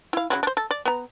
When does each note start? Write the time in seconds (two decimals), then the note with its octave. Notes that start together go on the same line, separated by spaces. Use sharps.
0.13 E4 F5
0.30 C#3 F#3 E4
0.43 D4 C5
0.57 A4
0.71 D5
0.85 B3 A#5